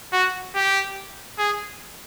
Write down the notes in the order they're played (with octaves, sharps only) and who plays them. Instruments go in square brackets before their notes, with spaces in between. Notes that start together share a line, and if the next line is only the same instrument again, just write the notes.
[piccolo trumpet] F#4
G4
G#4